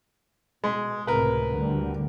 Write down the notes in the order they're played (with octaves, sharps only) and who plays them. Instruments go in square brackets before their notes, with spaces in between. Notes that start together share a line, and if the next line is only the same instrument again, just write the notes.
[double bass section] B2 [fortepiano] G#3
[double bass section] C#2 A2 C3 [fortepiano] A#4 B4
[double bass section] D2 D3 G3